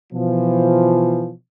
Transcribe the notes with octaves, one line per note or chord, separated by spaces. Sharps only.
B2 E3 F3